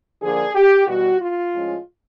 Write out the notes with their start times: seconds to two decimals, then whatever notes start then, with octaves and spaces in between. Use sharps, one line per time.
0.22 D3 F3 A#3 D4 G#4
0.55 G4
0.87 E2 B2 G3 B3 F#4
1.21 F4
1.53 A2 F3 G#3 C#4